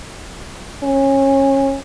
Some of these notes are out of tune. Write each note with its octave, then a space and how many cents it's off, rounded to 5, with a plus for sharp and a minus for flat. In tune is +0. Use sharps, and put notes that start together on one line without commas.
C#4 -25